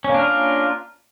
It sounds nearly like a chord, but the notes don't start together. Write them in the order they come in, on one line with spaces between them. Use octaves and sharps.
C#4 A#3 D4 A#4 F4